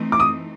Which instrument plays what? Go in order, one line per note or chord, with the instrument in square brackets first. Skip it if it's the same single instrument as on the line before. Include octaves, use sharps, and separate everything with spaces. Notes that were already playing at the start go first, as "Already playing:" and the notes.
Already playing: [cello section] E3 A3 C4 D#4
[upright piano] D6
D#6